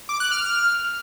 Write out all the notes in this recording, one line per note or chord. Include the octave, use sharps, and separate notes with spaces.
D6
F#6
F6